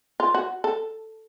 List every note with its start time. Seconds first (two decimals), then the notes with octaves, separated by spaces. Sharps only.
0.20 F4
0.34 F#4
0.64 A4